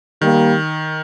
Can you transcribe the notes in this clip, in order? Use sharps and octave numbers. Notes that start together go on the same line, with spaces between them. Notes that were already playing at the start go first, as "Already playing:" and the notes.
D#3 G3 A#3